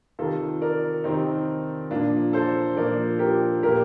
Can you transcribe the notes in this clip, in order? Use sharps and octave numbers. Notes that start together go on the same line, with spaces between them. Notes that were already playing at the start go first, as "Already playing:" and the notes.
C3 D#3 F4 A4
A#4 D5
C3 D#3 C4 D#4
A#2 F3 D4 F4
A4 C5
A#2 F3 A#4 D5
G4 A#4
A#2 F3 G4 A#4